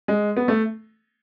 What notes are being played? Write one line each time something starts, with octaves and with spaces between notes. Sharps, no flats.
G#3
B3
A3